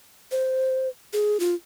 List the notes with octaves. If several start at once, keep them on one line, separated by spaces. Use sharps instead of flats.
C5
G#4
F4